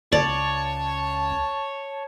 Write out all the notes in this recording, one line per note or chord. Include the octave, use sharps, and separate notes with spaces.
C#2 C#5 D5 A5